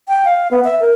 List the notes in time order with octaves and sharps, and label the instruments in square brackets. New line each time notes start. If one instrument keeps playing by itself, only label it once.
[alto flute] G5
F5
B3
E5
A#4